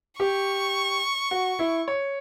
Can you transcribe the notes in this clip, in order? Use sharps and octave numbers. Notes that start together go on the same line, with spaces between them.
G4 C#6
F#4
E4
C#5